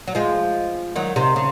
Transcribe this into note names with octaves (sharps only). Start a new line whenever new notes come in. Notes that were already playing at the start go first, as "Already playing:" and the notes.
F#3
F3 G#3
D#3 F#3
C3 D#3
C#3